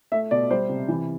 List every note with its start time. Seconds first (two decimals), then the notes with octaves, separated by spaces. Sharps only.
0.12 A3 E5
0.31 B2 D5
0.51 G3 C5
0.69 C3
0.88 E3